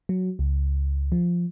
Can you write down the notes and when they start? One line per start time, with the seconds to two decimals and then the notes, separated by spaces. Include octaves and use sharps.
0.09 F#3
0.39 C#2
1.12 F3